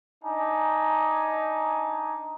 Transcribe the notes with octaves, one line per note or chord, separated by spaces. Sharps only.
D4 D#4 G#5